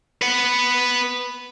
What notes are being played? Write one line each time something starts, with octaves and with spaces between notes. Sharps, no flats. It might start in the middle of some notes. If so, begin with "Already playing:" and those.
B4 F#5